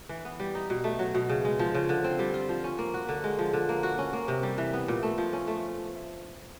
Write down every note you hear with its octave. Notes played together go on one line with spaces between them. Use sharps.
E3
B3
G3
D#4
B2
A3
F#3
B2
C#3
G#3
F3
C#3
D3
C4
G3
F4
F3
C#4
A#3
F#4
D3
G#3
F3
D3
A#3
F#4
C#4
A#3
C3
G3
E3
B3
A#2
A3
F3
C#4
A3